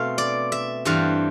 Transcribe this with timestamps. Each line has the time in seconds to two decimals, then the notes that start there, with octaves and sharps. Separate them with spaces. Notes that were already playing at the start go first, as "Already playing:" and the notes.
Already playing: B2 A3 C4 F5
0.18 D5
0.52 E5
0.85 G2 E3 G3 C4 F5